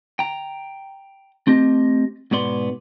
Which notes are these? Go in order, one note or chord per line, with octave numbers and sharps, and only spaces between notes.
G5 A#5
A3 C4 G4 D#5
G#2 B2 B3 D5 C6